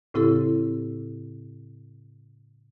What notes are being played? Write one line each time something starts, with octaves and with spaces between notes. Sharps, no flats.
A2 C#3 C4 E4 G4 A4